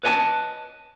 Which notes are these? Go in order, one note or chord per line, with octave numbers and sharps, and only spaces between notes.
B4 C#5 D#5 G#5 A5